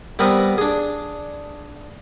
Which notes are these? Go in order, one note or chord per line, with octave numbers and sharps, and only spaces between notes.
G3 B3 C4 A#4 B4
D4 G#4